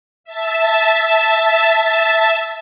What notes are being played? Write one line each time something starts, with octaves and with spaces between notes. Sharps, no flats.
E5 A5